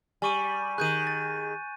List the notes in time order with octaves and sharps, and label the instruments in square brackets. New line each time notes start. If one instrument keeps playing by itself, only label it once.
[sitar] G3 [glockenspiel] G#5 C#6 D#7
[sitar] D#3 G#4 [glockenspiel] F#6 G6 D#7
[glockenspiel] A6